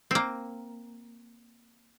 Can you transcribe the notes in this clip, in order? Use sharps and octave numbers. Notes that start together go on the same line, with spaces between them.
A#3 C4